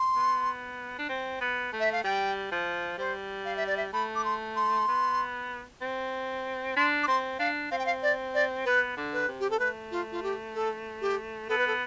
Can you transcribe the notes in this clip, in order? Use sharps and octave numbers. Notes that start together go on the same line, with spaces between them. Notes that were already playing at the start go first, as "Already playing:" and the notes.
Already playing: C6
B3
D4
C4
B3
A3
E5
F5
G3 G5
F3
G3 C5
F5
E5
D5
E5
A3 B5
D6
C6
C6
B3
C4
D4 C6
D6
C4 C6
D4 F5
C4 F5
G5
F5
D5
D5
B3 B4
D3
B4
C3
G4
A4
A3 B4
F4
F4
G4
A4
G4
B3 A4
B4
A4